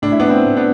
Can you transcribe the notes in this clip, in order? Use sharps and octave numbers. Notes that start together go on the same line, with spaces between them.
A2 D4
E4
B3 D4
C4 E4
A2
B3 D4